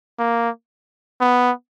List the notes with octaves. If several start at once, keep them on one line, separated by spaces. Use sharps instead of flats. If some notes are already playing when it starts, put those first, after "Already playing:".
A#3
B3